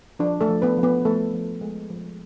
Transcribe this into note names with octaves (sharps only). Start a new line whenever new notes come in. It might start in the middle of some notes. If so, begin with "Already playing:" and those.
F3 D4
A3 A4
F3
B3 B4
F3
B3 B4
F3 A3 A4
F3
G#3
F3